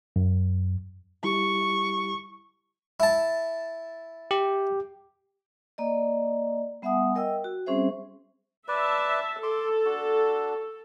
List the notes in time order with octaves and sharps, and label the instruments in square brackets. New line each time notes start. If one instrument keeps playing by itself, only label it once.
[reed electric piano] F#2
[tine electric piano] G3 E4 G4 [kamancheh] C#6
[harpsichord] E4 A5
[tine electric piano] G4
[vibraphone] A#3 D5 D#5
G3 B3 E5 F#5 G#5 D#6
A#4 D#5 G5 E6
F#4
G3 C4 C#4 G#4 C5 E5
[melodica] B4 D5 [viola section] E5 A5
[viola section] A4 [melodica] C6 D6
[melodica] D4 F#4